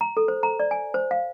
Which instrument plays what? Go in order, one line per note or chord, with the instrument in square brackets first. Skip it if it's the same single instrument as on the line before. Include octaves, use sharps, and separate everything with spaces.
[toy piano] A#5
A4
C5
A#5
D5
G#5
C5
F5